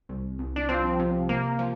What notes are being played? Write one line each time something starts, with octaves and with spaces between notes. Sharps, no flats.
C2
C2
D4
F3 C4
C3
C3 A#3
F3